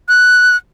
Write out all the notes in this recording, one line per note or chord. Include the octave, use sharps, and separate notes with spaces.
F#6